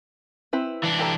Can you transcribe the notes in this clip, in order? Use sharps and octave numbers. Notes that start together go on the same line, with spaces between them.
C4 E4 B4
E3 D4
G4 A4 A#5